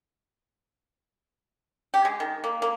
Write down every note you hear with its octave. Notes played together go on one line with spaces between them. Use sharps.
G4
G#3
D#3
A#3
A#3